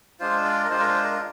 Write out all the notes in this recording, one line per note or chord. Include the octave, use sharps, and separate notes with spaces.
G#3 D4 F4 C5
D5
A#4
G#3 D4 F4 C5
A#4
C5
A#4